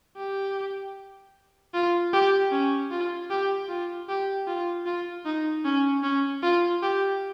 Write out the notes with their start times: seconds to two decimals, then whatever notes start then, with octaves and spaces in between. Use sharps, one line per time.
0.17 G4
1.74 F4
2.13 G4
2.52 C#4
2.91 F4
3.30 G4
3.69 F4
4.09 G4
4.47 F4
4.86 F4
5.26 D#4
5.65 C#4
6.03 C#4
6.43 F4
6.82 G4